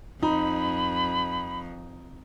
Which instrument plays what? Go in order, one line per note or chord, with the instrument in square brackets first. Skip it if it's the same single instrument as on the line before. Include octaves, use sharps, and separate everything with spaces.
[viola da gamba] F2 [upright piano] D#4 [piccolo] B5